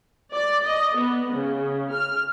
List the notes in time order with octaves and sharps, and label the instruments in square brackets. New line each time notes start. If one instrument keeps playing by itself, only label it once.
[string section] D5
D#5
B3
C#3
F6